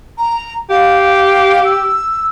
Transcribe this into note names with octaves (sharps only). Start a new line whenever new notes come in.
A#5
G4 F5
E6